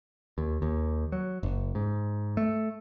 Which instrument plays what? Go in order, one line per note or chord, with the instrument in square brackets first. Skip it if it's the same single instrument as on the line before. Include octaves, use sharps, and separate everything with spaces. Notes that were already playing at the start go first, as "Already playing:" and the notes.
[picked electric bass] D#2
D#2
F#3
F#1
G#2
A3